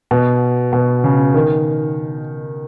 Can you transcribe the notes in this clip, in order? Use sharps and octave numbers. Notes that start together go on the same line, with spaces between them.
B2
B2
C#3
D#3